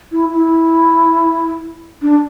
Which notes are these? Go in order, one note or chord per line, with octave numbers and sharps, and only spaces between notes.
E4
E4
D4